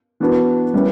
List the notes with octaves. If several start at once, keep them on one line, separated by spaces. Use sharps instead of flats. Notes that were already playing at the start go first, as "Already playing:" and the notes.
E3 B3 D4 F#4 B4
G3 C#4 E4 B4